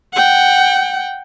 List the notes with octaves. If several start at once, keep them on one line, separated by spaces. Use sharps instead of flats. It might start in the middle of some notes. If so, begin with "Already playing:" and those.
F#5 G5